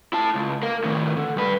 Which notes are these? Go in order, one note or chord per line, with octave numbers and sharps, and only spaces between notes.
E4 A5
C#2
A#4 F5
A2 D#3
D3
G2 B4